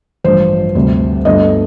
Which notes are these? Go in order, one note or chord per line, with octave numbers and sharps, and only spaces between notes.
A1 G2 F3 C5
D2 C3 G3
G1 G2 D3 A3 D#5